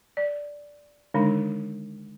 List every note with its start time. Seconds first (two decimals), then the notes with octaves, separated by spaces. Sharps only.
0.17 D5
1.14 D3 D#3 G#3 D4 D#4